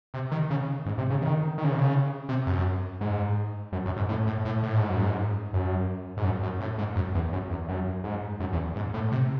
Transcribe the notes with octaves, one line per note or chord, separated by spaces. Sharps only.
C3
D#3
C#3
G#2
C3
C#3
D#3
D#3
C#3
C3
C#3
C3
F#2
G#2
F#2
F#2
G#2
A2
A2
A2
A2
G#2
F#2
G#2
F#2
G#2
F#2
F#2
A2
G#2
F#2
E2
F#2
E2
F#2
G#2
F#2
E2
G#2
A2
C3